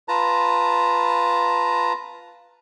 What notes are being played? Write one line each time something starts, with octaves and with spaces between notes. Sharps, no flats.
F4 B4 A5 A#5